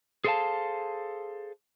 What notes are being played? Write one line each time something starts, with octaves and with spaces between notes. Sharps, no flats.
G#4 A4 C5 D5 F5 A5